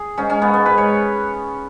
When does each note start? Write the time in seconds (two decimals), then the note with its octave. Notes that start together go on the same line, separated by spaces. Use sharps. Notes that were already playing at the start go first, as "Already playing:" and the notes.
Already playing: G#4
0.18 G#2 C#4
0.30 C#4
0.42 G#2 B3
0.54 B3
0.66 G#2 B4
0.78 C#5